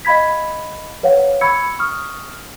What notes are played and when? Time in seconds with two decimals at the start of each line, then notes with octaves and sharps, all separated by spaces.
0.05 D#5 F5 B5 G#6 B6
1.03 B4 C#5 F5 F#5
1.41 B5 C#6 E6 G#6 C#7
1.79 C#6 D#6 F6